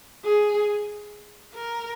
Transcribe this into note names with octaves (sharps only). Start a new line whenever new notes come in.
G#4
A#4